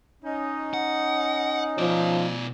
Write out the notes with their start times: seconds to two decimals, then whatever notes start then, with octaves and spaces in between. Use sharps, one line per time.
0.23 C#4 D#4
0.74 F#5
1.78 B2 F3 D5